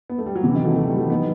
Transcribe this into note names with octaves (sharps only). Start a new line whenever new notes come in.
B3
A3
G3
F#3
C3 E3
D#3
F#3 A3
F#3 A3
E3 G3
F#3 A3
B3 D#4